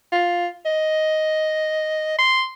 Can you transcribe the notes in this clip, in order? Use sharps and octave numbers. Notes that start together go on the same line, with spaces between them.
F4
D#5
C6